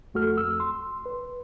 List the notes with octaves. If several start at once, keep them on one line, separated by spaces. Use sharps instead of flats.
F2 A3 F#4 A4 F6
F2 E6
C6
B4